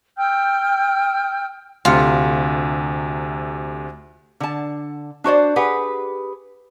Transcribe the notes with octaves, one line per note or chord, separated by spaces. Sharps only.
G5 E6 F6 G6
D2 C3 F4 C#7
D3 A5
D4 F#4 C5 D5
G4 G#4 B4 F#5